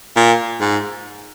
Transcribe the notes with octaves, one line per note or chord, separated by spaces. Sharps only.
A#2
G#2